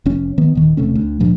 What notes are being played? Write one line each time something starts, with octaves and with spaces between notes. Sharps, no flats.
F1 C#4
D#3 B3
D#1 D#3
E1 C3 A3 C#4
D2
D2 G2 A#2 F3